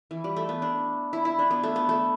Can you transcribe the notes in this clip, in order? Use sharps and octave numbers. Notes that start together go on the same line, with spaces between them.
E3
G3
A3
B3
D4
E4
E4
D4
B3
A3
B3
A3